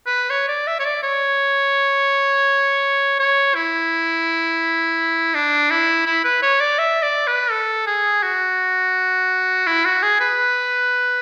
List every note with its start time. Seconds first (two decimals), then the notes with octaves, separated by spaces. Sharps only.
0.06 B4
0.30 C#5
0.48 D5
0.67 E5
0.80 C#5
0.85 D5
1.03 C#5
3.19 C#5
3.55 E4
5.34 D4
5.70 E4
6.06 E4
6.25 B4
6.43 C#5
6.61 D5
6.79 E5
7.03 D5
7.27 B4
7.51 A4
7.87 G#4
8.23 F#4
9.67 E4
9.85 F#4
10.03 G#4
10.20 B4